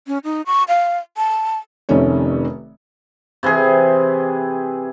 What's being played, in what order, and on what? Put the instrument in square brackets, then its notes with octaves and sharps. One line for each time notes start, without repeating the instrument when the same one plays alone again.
[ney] C#4
D#4
C#6
F5
A5
[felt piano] F1 C3 D#3 A3 C#4 C#5
[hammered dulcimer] C3 E3 C4 G#4